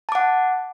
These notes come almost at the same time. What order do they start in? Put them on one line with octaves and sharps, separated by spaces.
A5 D6 F#5